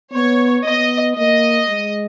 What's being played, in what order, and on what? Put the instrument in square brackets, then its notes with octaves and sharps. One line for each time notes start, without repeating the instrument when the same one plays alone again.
[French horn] B3 [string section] C#5
[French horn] B3 [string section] D#5
[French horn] A#3 [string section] D#5
[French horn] G#3